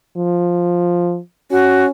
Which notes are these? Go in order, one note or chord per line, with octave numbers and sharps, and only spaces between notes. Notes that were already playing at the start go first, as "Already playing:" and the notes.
F3
C#4 F#4